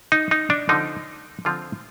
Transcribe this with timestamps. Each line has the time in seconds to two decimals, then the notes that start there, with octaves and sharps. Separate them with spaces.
0.12 D#4
0.31 D#4
0.50 D4
0.69 D3 F3 C4 D#4
1.45 D3 F3 C4 F4